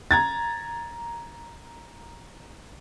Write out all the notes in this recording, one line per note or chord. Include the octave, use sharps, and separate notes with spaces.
A#5 G#6 A6